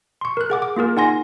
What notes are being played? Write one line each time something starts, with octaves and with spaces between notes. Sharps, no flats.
C6 C#6
A#4 F#6
G#4 F#5 D6
D6
A#3 F4 G#4 A#4
D#4 F#5 G#5 C6 A#6